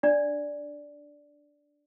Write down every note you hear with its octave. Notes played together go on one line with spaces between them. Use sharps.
D4 D5